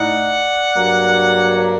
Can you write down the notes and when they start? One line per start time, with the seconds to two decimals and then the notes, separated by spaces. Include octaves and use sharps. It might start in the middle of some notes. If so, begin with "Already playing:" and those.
Already playing: A2 A3 D#4 D5 F#5
0.74 G2 F#3 A#3
1.58 A#4 D5